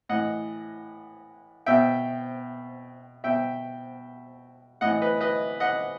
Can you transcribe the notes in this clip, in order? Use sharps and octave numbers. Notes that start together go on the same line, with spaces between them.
A2 E3 D#5 F#5
B2 E5 G5
B2 E5 G5
A2 E3 D#5 F#5
B4 D#5
B4 D#5
D#5 F#5